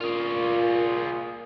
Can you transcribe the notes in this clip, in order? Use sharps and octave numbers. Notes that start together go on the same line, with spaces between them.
A#2 F4 G#4